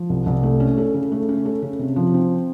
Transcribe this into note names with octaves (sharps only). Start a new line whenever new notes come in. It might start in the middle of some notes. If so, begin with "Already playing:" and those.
Already playing: F3
C2
C2
A3
C#4
A4
C#3
A3
C#4
A4
C#3
C3
F3
C4